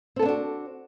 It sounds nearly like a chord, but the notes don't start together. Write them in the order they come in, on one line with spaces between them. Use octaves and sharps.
C4 A4 B3 D4 F#4